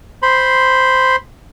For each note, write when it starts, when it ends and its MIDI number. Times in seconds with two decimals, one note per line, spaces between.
0.22 1.16 72
0.22 1.16 83
0.22 1.16 84